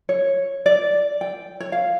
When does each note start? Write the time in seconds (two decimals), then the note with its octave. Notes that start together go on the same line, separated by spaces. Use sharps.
0.09 C#5
0.66 D5
1.21 G5
1.60 C#5
1.72 F5